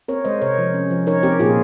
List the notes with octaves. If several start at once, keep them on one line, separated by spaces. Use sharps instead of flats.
C4 A#4 C#5
G#3 C5 D#5
C3 A#4 C#5
F3
C#4
F3
D#4 A#4 C#5
C4 G4 A#4
A#2 F4 G#4